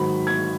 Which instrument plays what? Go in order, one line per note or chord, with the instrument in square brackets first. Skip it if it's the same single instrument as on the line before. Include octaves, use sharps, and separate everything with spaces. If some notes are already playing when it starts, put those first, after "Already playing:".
Already playing: [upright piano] G#2 D#3 F#3 B5
G#6